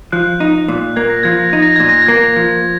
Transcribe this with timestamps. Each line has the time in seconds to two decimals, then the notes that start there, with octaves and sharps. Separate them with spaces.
0.12 F3 F#6
0.40 D#4
0.68 A#2
0.96 A#3 G#6
1.10 A#6
1.23 F3 G#6
1.36 A#6
1.50 D#4 G#6
1.62 A#6
1.76 A#2 G#6
1.89 A#6
2.02 G#6
2.08 A#3
2.36 F3